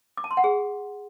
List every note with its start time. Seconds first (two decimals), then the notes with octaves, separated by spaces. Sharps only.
0.17 D6
0.24 A5
0.31 C6
0.37 F#5
0.44 G#4